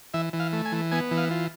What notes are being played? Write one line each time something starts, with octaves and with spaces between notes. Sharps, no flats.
E3 E5
E3
F5
A3
G#5
E3
B3 G#5
E3
F5
F4